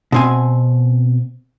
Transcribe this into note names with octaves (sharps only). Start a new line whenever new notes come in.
B2 C4 G#5